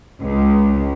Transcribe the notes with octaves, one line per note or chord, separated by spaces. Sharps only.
C#2